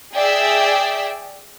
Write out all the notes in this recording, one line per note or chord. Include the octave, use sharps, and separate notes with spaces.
G#4 D5 E5 G5